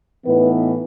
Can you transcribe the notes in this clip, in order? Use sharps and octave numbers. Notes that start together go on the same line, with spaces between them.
A2 E3 B3 D#4 B4